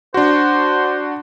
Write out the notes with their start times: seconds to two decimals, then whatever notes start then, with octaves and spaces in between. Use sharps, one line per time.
0.14 D4 F#4 C5